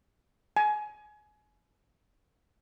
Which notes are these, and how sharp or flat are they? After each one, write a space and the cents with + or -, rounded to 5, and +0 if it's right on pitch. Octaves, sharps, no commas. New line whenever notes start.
G#5 +25